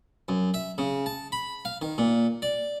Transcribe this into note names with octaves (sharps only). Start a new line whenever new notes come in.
F#2
E5
C#3
A5
B5
F5
D#3
A#2
D5